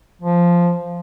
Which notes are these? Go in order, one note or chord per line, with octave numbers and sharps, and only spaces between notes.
F3